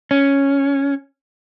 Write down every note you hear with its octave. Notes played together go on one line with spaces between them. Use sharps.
C#4